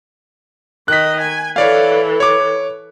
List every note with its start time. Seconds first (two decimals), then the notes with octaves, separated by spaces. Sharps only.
0.88 D#3 D#5 F#6 B6
1.20 G#5
1.56 E3 A4 C#5 D5 F5
2.20 C#5 D6